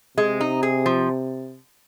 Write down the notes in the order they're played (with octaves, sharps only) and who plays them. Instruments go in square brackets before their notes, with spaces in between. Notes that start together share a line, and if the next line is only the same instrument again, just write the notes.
[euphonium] C3 [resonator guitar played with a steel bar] G#3
[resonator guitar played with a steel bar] D#4
G#4
F3